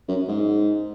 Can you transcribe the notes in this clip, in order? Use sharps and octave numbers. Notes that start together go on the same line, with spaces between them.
F#2
G#2